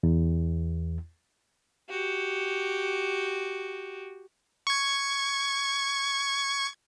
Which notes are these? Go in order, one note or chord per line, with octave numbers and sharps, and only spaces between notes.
E2
F#4 G4
C#6 G#6